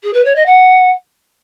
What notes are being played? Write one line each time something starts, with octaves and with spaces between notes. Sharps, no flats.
G#4
B4
C#5
D#5
F#5